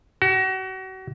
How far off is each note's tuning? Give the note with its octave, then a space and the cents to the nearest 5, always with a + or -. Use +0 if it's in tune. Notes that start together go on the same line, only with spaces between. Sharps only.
F#4 +35